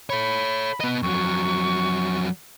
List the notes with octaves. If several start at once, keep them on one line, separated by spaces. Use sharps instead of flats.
A4 C#5 B5
B3 D#5
F2 F#3 C#6